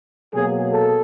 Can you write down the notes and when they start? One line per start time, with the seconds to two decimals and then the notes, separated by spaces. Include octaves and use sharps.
0.33 B2 F#3 A#3 G#4
0.73 A4